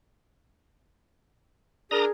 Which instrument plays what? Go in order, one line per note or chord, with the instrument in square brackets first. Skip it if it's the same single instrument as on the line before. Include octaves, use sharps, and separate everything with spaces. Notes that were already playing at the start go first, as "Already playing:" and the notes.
[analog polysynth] D4 A#4 [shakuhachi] G#4 [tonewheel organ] A#5 D#6